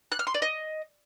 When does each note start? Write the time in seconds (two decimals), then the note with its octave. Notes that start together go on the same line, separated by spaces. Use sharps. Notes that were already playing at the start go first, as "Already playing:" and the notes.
0.12 F#6
0.19 F6
0.27 C6
0.34 D5
0.42 D#5